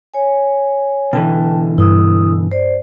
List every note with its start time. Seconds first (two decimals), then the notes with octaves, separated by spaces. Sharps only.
0.14 C#5 G#5
1.13 B2 D3 E3 G5 A5
1.78 G2 E4 D#6 E6
2.52 C5 D5